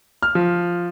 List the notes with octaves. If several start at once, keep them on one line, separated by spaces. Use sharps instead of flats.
F6
F3